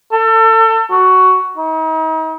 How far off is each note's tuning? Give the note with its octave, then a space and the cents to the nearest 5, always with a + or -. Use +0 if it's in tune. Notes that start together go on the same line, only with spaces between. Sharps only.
A4 +30
F#4 +10
D#4 +40